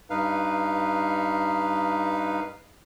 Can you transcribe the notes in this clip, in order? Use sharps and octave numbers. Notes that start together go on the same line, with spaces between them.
G2 D#4 B4 F5